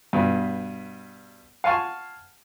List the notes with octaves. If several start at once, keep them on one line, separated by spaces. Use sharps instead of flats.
G2 B2 B3
F5 F#5 G#5 A5 C6 C#6